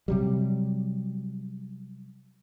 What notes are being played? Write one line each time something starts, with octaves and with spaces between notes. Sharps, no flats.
C3 F#3 G3